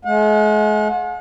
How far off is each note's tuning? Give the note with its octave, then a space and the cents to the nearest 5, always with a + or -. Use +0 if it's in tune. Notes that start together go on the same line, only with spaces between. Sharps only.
G#3 +45 F#5 -40